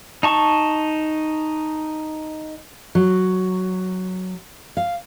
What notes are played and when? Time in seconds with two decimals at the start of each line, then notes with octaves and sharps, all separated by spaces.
0.23 D#4 A5 C#6
2.95 F#3
4.77 F5